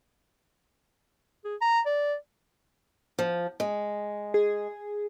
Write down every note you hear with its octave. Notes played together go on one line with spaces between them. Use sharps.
G#4
A#5
D5
F3
G#3
G#4